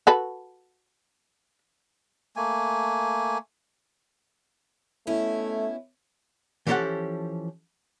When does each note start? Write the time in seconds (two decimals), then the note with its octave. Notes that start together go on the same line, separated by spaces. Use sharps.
0.07 F#4 A4 B4
2.36 A3 A#3 G#5
5.07 B2 A3 C#4 E4
6.67 E3 F3 C#4 G4 A4 F#5